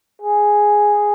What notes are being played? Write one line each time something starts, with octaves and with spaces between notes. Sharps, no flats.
G#4